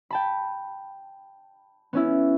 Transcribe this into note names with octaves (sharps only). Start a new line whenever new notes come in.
G5 A5 B5
B3 C#4 E4